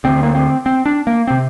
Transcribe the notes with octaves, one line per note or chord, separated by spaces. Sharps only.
D2 D3 C4
A#3
C4
C4
D4
A#3
C3 C4